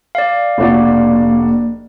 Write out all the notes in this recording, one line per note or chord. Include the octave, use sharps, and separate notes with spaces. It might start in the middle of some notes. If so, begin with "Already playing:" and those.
D5 F5
F1 A#3 D4 F#4